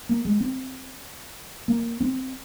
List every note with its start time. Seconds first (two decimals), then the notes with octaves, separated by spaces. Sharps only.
0.09 A#3
0.25 G#3
0.40 C4
1.68 A#3
2.00 C4